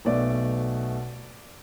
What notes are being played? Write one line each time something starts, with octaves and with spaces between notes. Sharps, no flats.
B1 B2 A3 D5